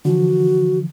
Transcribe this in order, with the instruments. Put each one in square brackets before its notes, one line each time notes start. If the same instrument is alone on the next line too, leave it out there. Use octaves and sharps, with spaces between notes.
[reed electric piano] D3 E3 F3 [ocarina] F#4